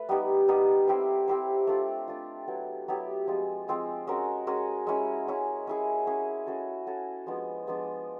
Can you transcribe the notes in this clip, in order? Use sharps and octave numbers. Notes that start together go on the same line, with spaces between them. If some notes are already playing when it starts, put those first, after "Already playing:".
Already playing: A3 B4
G3 B3 D#4 G4
G3 B3 D#4 G4
C4 E4 G4 C5
C4 E4 G4 C5
A3 D4 F4
A3 D4 F4
F#3 B3 E4 G4
F#3 B3 E4 G4
F3 G#3 C4 F4
F3 G#3 C4 F4
G#3 C#4 F#4 A#4
G#3 C#4 F#4 A#4
G#3 C#4 E4
G#3 C#4 E4
C#4 E4 G#4
C#4 E4 G#4
C#4 F#4 A4
C#4 F#4 A4
F3 G#3 B3 D4
F3 G#3 B3 D4